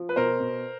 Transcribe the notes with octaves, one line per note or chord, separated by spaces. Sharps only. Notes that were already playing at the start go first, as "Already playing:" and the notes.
Already playing: F3
B4
B2 A#4 C5
B2